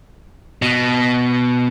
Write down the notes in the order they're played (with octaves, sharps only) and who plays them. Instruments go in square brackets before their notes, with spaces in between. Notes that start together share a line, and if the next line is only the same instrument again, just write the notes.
[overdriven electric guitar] B2